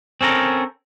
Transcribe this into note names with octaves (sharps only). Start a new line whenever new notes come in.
C4 C#4 A4 A#4